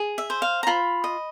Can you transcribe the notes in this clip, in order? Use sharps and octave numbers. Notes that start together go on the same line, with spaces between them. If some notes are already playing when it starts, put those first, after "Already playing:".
Already playing: G#4
E5
C5
F5
A#5
F4 B5
D#5